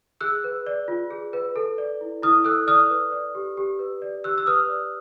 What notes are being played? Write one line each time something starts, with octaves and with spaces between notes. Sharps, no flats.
G#4 E6 F#6
B4
D5
F4
G#4
B4
A4
D5
E4
E4 D#6 F6
A4 E6 F#6
D5 D#6 F6
B4
D5
G4
G4
B4
D5
G4 E6 F#6
E6
B4 D#6 F6
D5